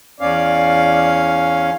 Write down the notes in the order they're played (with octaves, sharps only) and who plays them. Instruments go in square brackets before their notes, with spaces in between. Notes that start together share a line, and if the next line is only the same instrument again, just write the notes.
[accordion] E2 C#4 F5 [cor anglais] D5